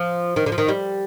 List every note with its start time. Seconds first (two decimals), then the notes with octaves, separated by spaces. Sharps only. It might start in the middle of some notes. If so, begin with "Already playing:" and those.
Already playing: F3
0.36 D#3
0.46 D3
0.52 F3
0.58 D#3
0.69 G3